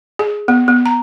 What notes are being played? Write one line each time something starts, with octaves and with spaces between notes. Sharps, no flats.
G#4
B3
B3
A#5